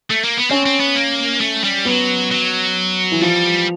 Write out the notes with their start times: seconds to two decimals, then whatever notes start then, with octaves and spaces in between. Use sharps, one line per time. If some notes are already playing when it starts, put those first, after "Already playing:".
0.10 A3
0.24 A#3
0.37 B3
0.50 C4 C#4
0.66 C4
0.80 B3
0.95 A#3
1.40 A3
1.64 G3
1.85 F#3 B3
2.32 F#3
3.12 E3
3.21 F3 G3